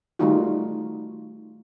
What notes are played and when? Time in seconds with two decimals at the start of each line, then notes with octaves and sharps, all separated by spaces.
0.19 D#3 G3 A3 D#4 F4 F#4